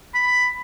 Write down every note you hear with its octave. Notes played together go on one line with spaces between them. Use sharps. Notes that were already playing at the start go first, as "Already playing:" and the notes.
B5